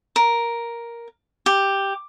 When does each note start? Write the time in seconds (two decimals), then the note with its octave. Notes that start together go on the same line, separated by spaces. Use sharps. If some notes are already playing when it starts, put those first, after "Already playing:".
0.16 A#4
1.46 G4